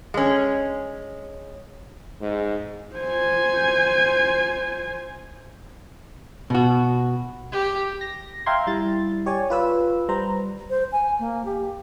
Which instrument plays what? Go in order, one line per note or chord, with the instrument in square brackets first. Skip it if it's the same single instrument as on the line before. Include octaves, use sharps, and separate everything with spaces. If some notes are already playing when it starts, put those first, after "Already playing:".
[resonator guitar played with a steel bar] G#3 C#4
[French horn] G#2
[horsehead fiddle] C5 G#5
[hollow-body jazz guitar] B2 F#4
[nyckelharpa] G4
[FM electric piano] A#6
E5 F5 G5 A#5 C6 G#6
G3 E4 A6
G4 C#5 D5 G#5
F4 B4 E6
G3 B4 C5 A#5
[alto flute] C5
G#5
A#3
G4